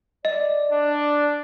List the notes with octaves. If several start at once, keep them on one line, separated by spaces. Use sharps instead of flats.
D5 D#5
D4